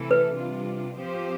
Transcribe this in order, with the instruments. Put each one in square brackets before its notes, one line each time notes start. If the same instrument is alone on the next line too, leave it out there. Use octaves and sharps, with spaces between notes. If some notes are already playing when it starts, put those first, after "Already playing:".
Already playing: [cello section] C3 E3 A3 E4 A4
[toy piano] B4
[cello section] C3 G3 D4 F4
F3 C4 G4 C5